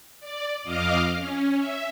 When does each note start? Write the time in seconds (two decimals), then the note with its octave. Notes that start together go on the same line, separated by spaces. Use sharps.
0.20 D5
0.63 F2 D#5 F5 D6 F6
1.17 C#4
1.58 E5